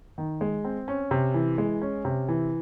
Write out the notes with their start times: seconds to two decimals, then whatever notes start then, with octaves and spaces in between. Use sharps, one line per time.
0.18 D#3
0.41 G#3
0.65 C4
0.88 C#4
1.11 C3
1.34 E3
1.58 G#3
1.81 C#4
2.05 C3
2.28 E3